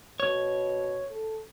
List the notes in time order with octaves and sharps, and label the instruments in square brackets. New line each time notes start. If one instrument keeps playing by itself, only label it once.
[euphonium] B2 [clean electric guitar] C#5
[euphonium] A4